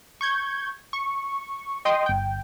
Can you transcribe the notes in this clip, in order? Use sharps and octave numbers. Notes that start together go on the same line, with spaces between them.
C#6 G6 G#6
C#6
D#5 G5 C6 D#6
G1 G5